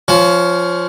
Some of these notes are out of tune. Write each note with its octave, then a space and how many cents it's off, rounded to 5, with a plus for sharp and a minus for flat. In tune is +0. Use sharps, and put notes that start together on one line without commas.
F3 +0 C#4 +15